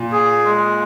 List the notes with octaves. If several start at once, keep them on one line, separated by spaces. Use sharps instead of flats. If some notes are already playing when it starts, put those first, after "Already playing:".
Already playing: A#2
G#4
G#3